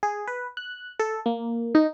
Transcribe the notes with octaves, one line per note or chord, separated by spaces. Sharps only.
G#4
B4
F#6
A4
A#3
D#4